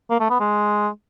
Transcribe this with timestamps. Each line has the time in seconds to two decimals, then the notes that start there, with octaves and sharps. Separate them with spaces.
0.10 A#3
0.20 A3
0.30 B3
0.40 G#3